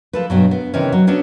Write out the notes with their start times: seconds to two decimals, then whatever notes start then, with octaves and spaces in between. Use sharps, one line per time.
0.13 F3 A4 B4
0.30 G2 B2 F#3
0.51 B3
0.74 C3 D#3 E3 C#4
0.92 F#3
1.07 B3 C#4 D4 F#4 A4